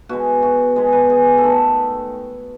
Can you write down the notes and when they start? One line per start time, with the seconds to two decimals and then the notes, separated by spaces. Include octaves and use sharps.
0.09 B2 G#3 F#4
0.42 F#4
0.76 B2 G#3 C#5
0.93 B4
1.10 G#4
1.38 A4
1.43 D#3 A3 B4